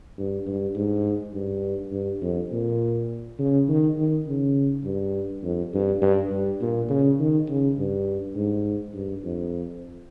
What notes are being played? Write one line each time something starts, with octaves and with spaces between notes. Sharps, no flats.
G2
G2
G#2
G2
G2
F2
A#2
C#3
D#3
D#3
C#3
G2
F2
G2
G2
G2
A#2
C#3
D#3
C#3
G2
G#2
G2
F2